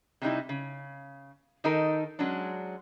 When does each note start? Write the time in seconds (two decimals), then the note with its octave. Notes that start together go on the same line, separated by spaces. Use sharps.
0.22 C3 G3 D#4 E4
0.49 C#3
1.64 D#3 D#4 A4 A#4
2.19 F#3 G#3 C#4 D4